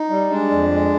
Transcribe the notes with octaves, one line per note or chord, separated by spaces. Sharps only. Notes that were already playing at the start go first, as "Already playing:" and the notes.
Already playing: D#4
G3
G#3 D4
F2
G#3